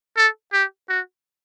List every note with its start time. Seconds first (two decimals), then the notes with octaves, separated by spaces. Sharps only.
0.17 A4
0.53 G4
0.89 F#4